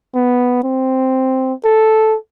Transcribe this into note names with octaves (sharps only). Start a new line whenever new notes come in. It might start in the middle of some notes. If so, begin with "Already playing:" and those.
B3
C4
A4